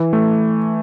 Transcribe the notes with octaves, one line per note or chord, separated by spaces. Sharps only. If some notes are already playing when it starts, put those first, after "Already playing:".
Already playing: E3
A3